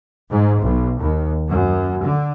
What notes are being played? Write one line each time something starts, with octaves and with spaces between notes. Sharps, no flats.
G#2
B1
D#2
F#2
D3